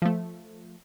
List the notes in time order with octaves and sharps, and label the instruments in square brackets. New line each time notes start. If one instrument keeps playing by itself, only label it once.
[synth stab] F3 A3